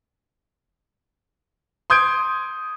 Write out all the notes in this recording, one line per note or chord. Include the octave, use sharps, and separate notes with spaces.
C6 D#6 G6 G#6 D7